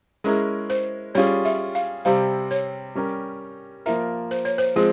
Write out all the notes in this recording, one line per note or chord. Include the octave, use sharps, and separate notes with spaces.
G#3 C#4 E4 G#4 A#4
C5
G3 C#4 F4 G#4 C#5
E5
F5
C3 G3 C4 F5
C#5
G3 C#4 G4 A#4
F3 A#3 F4 A#4 E5
C5
C#5
C5
F3 G#3 C4 G#4